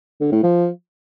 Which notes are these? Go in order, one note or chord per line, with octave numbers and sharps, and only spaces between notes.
D3
A2
F3